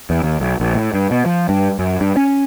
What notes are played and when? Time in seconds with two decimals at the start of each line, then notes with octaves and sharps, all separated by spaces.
0.10 E2
0.23 D#2
0.40 B1
0.60 A#1
0.75 A2
0.94 G2
1.11 B2
1.26 F3
1.49 G2
1.79 F#2
2.01 G2
2.17 C#4